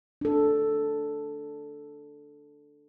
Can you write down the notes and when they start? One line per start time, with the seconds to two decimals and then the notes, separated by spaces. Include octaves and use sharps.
0.21 D4 A4